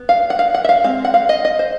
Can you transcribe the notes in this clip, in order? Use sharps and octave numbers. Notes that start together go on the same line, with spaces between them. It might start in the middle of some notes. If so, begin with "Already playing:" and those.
Already playing: B3
F5
F#5
F5
F#5
E5
F5
G#3 C4 F5
F#5
F5
D#5
D#5
C5